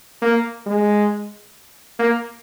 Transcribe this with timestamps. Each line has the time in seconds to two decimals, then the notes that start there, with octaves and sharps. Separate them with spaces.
0.22 A#3
0.66 G#3
1.99 A#3